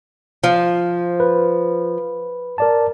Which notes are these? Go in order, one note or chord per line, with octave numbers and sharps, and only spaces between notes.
F3
B4
A#4 D5 A5